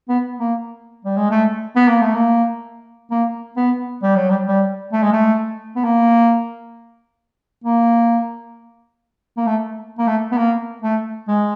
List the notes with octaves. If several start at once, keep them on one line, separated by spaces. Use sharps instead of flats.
B3
A#3
G3
G#3
A3
B3
A#3
A3
A#3
A#3
B3
G3
F#3
G3
G3
A3
G#3
A3
B3
A#3
A#3
A#3
A3
A#3
A3
B3
A#3
A3
G#3